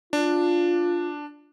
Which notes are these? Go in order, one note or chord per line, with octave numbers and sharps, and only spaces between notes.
D4 F4